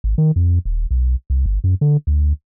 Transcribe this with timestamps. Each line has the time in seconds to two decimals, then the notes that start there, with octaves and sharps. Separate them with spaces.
0.04 G#1
0.18 D#3
0.36 F2
0.65 D#1
0.91 B1
1.30 C2
1.46 G1
1.64 F#2
1.81 D3
2.07 D2